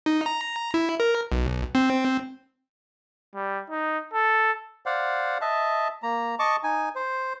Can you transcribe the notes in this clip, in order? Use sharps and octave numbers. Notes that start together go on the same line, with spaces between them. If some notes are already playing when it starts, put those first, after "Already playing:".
D#4
A#5
E4
A#4
B1
C4
G3
D#4
A4
C5 D5 F5 F#5
D#5 E5 A5
A#3 A#5
D#5 A5 C#6 D6
D#4 G#5
C5